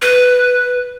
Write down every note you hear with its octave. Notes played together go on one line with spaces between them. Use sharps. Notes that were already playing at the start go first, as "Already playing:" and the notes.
B4